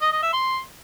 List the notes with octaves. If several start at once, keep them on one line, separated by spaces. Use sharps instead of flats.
D#5
D#5
E5
C6